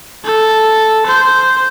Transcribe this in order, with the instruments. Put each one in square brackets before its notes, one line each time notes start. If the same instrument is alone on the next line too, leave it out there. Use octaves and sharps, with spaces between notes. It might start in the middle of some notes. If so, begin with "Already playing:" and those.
[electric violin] A4
C5